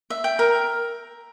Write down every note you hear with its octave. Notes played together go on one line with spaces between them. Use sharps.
E5
G5
A#4